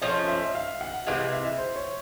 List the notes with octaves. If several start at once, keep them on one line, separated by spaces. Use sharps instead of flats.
F3 A3 C#4 D#5
E5
F5
F#5
C3 E3 G#3 F5
E5
C5
C#5